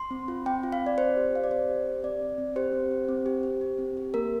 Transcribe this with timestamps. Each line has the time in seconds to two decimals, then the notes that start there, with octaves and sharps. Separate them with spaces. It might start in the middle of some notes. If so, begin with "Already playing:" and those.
Already playing: C6
0.11 C4
0.28 F4
0.46 C4 G5
0.63 F4
0.72 F5
0.81 C4
0.86 D5
0.98 C4 C5
1.16 G4
1.33 G4 F5
1.44 D5
1.50 C4 C5
1.69 G4
1.85 G4
2.03 C4 D5
2.21 C4
2.38 C4
2.56 G4 C5
2.73 C4
2.91 G4
3.09 C4
3.26 G4
3.43 G4
3.61 G4
3.78 C4
3.97 G4
4.14 A#3 A#4